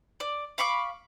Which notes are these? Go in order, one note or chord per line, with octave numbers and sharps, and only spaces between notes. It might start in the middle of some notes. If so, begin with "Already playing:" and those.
D5
F5 B5 C#6 D6